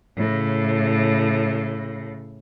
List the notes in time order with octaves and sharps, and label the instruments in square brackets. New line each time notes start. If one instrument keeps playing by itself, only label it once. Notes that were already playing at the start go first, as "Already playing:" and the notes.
[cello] A2 C#3